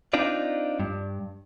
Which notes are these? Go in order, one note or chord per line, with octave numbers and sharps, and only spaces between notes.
C4 D4 D#4 F4 D5
G2